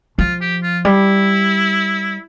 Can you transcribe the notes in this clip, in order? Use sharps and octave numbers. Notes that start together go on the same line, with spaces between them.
F3 F4
G4
F4
G3 E4